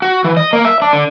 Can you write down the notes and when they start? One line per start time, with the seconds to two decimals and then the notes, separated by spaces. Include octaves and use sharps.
0.02 F#4
0.24 E3
0.37 D#5
0.53 A#3
0.65 E5
0.82 D4
0.93 D3